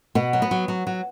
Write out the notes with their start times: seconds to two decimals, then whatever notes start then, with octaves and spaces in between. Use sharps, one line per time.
0.15 B2 B3
0.33 F#3
0.42 B3
0.51 F#3
0.68 F#3
0.87 F#3